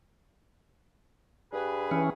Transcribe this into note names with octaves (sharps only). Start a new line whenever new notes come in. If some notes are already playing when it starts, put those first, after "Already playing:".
G2 G#4 B4
E3 C#4